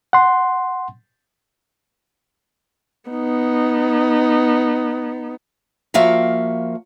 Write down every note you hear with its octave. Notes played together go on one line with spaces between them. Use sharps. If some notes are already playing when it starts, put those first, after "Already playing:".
F#5 C6
B3 D#4
F3 A#3 F#4 E5 F5